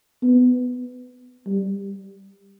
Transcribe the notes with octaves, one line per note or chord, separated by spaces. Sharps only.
B3
G3